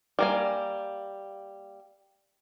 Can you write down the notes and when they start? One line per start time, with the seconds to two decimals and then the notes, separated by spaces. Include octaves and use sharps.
0.19 G3 A#3 G#5